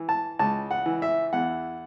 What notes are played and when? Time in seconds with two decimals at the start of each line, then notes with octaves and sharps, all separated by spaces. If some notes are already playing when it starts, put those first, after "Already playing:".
Already playing: E3
0.09 A5
0.39 C#2 A5
0.71 F#5
0.86 E3
1.02 E5
1.33 E2 F#5